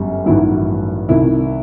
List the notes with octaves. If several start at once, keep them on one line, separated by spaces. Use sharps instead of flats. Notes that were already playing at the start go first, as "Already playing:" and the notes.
Already playing: G1 F#2 G3
A1 G2 D#3 F#3 E4
C2 C3 D#3 E4